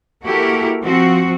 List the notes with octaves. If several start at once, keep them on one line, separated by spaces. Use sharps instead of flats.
A#3 E4 F#4 G4 A4 A#4
F3 C4 F#4